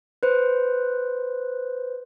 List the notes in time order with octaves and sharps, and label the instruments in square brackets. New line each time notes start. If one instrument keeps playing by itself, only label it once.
[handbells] B4 C5